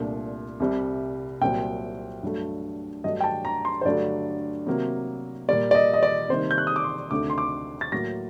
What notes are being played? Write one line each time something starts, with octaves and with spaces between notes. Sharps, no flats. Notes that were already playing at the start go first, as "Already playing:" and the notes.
Already playing: C2 A#2 A3 D4
C2 C3 G3
C2 A#2 F#3 C4 G5
G2 F#3 A3
G2 F#3 A3 D4 D#5
G5
A5
A#5
C6
C5
G2 D3 F#3 A3 D4 D5
C3 F#3 A#3
A#2 G3 A#3 D5
D5
D#5
D#5
D5
C3 D#3 G3 A#3 D#4 C5
G6
F#6
D#6
D6
C6
D2 C3 D#3 A3 D4 D6
C6
D6
A6
A2 F#3 A#3 A#6